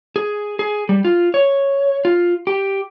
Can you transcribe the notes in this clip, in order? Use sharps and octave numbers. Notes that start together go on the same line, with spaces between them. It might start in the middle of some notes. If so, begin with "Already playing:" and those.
G#4
G#4
G3
F4
C#5
F4
G4